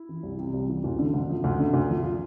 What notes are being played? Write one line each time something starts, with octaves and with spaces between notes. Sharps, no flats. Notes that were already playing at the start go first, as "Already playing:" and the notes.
Already playing: E4
E3
C2
C3
C2
E3
D2
D3
D2
F3
D2
D3
D2
F3
F4